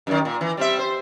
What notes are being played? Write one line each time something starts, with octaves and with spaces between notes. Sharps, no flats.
F#2 D#3
A#2
E3
G3 C4 E5
C5